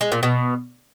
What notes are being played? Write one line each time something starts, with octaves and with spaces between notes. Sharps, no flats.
G#3
A#2
B2